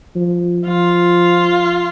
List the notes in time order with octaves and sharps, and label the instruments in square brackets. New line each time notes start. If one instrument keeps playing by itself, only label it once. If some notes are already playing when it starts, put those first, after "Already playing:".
[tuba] F3
[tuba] F3 [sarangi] F4